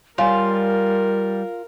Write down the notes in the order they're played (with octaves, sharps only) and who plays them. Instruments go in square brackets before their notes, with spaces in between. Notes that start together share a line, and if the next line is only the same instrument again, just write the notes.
[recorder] G3 [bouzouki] F4 [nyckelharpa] A#4 [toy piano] C#5 F5 G#5